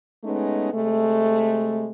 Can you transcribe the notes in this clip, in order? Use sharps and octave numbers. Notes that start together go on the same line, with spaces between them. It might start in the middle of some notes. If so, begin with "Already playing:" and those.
G#3 A3 B3 C#4 D#4
C3 G#3 A3